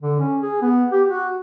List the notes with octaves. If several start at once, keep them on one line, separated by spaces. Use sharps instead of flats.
D3
C#4
G#4
B3
G4
F#4